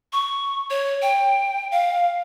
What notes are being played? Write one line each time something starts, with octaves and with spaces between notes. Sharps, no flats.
C#6
C#5
G5
F5